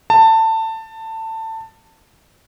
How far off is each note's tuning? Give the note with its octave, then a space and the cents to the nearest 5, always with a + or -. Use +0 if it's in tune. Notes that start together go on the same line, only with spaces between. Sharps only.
A5 +20